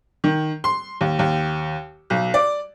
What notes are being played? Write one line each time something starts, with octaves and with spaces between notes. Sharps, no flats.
D#3
C6
D#2
D#2
B1
D5